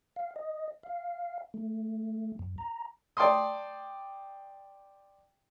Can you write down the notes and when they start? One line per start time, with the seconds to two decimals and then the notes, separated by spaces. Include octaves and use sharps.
0.16 F5
0.36 D#5
0.83 F5
1.54 A3
2.39 F#2
2.58 A#5
3.17 D5 G5 A5 C6 D#6